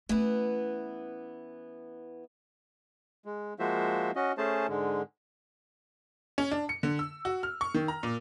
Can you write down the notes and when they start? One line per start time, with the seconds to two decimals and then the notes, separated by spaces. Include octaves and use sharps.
0.09 E3 A3 B3 C#4
3.25 G#3
3.59 F3 G#3 A#3 F#4 C5 E5
4.16 C#4 F#4 D#5
4.38 A3 C#4 G#4 C5 A5
4.69 G#2 D3 G#3
6.38 C#4
6.51 D4
6.69 C#7
6.83 D3
6.99 E6
7.25 F#4
7.43 F6
7.61 C#6
7.74 D#3
7.88 A#5
8.03 A#2